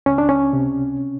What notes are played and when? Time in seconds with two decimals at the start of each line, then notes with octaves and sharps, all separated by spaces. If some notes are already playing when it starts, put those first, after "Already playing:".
0.06 C#2 C#4
0.18 D4
0.29 C#4
0.53 C3